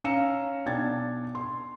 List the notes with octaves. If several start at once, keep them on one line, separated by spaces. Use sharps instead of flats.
C#4 F5 A#5 E6 C#7 E7
B1 D4 G5 G#6 A6
C6